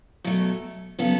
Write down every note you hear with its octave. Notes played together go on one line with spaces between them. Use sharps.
B2 F#3 A3
C#3 F#3 B3 A4